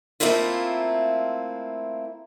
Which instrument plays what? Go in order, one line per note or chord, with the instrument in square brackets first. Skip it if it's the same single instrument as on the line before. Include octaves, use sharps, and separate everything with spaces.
[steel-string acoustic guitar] A3 A#3 C4 E4 F4